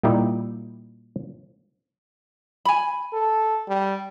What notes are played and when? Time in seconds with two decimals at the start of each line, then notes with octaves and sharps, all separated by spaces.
0.03 A#2 G3 D#4 E4 G4
2.65 G#5 B5
3.13 A4
3.69 G3